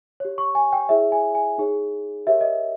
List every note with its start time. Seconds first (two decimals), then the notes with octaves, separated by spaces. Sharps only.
0.20 G4 C#5
0.38 C#6
0.55 G#5
0.73 G5
0.89 E4 G#4 C#5 E5
1.12 G#5
1.35 G#5
1.58 D#4 G#4 C#5
2.27 G4 A#4 C#5 E5
2.41 D#5